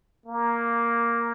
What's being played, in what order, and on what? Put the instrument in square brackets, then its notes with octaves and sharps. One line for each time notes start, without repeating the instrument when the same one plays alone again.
[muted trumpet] A#3